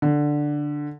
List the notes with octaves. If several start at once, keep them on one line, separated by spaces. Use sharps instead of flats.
D3